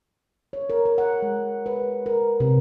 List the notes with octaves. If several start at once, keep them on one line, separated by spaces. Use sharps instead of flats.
C#5
A#4
A#4
F#5
G#3
B4
A#4
C3